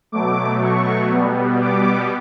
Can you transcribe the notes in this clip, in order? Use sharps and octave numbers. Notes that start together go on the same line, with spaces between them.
B2 F#3 A3 D6
C#6
B2 G3 B3
D6